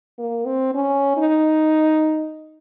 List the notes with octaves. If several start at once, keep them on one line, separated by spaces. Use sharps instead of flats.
A#3
C4
C#4
D#4